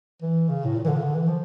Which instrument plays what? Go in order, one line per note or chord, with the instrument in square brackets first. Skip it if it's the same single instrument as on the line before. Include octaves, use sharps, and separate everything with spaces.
[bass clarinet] E3
C#3
A2
A#2
E3
D3
C#3
D3
E3
F3